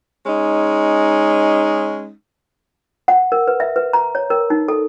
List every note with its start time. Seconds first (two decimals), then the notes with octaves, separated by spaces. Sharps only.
0.26 G#3 C#4 D#4
3.08 F#5
3.32 A#4
3.48 B4
3.60 E5
3.76 B4
3.93 A#5
4.15 C#5
4.30 A#4
4.50 D#4
4.68 A4